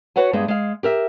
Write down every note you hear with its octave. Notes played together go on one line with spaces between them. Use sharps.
F#4 B4 C#5 F#5 G#5
G2 G#3 B3
G#3 F5
G4 A#4 E5